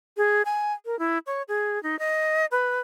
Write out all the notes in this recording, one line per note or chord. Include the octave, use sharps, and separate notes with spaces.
G#4
G#5
A#4
E4
C#5
G#4
D#4
D#5
B4